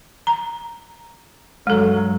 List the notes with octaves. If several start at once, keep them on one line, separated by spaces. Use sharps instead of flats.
A#5
G2 F#3 G#3 A4